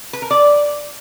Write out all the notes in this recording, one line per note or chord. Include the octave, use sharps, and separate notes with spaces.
B4
A#4
D5